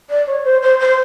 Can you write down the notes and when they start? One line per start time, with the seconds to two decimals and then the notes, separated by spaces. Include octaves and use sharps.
0.10 D5
0.27 C#5
0.45 C5
0.62 C5
0.80 C5